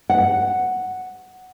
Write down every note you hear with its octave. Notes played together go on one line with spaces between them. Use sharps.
F#5